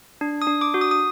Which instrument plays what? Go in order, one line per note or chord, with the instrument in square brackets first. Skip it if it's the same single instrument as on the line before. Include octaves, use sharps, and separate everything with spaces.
[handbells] D4
D#6
D4
D6
F#4
D#6
D#6